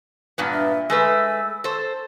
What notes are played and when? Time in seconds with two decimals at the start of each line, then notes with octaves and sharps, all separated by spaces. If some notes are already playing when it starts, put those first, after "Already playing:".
0.38 G2 A#2 B3
0.53 E5
0.90 G#3 A3 B4 E6
1.64 A4 C5